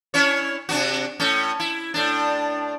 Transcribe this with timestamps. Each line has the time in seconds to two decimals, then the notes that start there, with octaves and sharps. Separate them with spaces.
0.14 C#4 E4 C#5
0.69 C3 D4 F#4
1.20 A2 C#4
1.60 E4
1.94 A2 D4